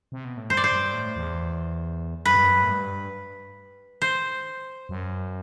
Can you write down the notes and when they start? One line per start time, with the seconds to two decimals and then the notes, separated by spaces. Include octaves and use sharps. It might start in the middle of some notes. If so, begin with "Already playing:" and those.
0.12 C3
0.25 B2
0.37 A2
0.50 G2 C5
0.57 D5
0.64 C5
0.72 G2
0.94 A2
1.16 E2
2.25 F#2 B4
2.36 G2
2.45 F#2
2.63 A2
2.70 G2
4.02 C5
4.89 F#2